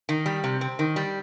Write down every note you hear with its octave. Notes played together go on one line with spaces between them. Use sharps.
D#3
G3
C3
C4
D#3
G3